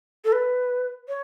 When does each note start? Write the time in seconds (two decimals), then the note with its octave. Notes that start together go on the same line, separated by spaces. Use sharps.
0.25 A4
0.32 B4
1.09 C#5